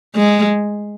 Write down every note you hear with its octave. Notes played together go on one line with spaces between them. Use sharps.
G#3